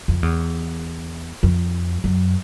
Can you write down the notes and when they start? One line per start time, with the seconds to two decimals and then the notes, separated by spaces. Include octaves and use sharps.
0.08 F2
0.23 E2
1.43 F2
2.04 F#2